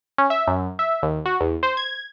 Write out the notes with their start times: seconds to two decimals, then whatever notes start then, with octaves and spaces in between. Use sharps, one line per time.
0.18 C#4
0.30 E5
0.47 F#2
0.79 E5
1.03 D#2
1.26 F#4
1.41 E2
1.63 C5
1.77 G#6